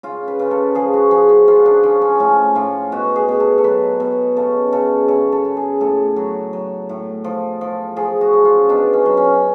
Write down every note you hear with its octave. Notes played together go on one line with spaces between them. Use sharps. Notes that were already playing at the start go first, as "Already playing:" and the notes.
C#3 F4
B4
C#3
A4
F3 G#4
F#4
F3 G#4
F#4
F3 F4
D4
F3 C#4
C#4
A2 C#4
A2 F4
B2 F#4
G#4
B2
A4
A4
F#3 B4
B2
C#3 A4
C#3 A4
C#3 A4
A4
C#3
G#4
A2 A4
F#3
F#3
A2
F3
F3
F3 G#4
F#4
C#3
F4
B2 D4
C#4
F#3
C#4